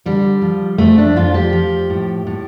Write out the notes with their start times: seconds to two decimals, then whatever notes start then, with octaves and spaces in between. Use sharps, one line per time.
0.06 D3 G3
0.42 F3
0.78 F2 A3
0.98 D4
1.16 F2 F4
1.34 G4
1.53 F3
1.90 A2
2.27 A2